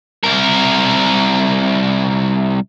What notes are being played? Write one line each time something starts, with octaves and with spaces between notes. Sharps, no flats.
C2 A#4